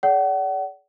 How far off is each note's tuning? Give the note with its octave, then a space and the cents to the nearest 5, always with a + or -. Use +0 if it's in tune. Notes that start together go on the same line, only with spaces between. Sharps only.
G#4 +25 D5 -35 F#5 +40